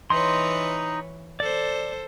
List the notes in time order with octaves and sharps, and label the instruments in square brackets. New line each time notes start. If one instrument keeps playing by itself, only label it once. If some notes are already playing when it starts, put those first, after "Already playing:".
[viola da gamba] E3 B4 C#5 [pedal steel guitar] D#4 C6
[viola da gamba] A4 C5 [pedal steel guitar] D5